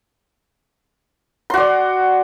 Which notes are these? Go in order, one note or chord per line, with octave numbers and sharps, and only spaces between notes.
F#4 D5 C6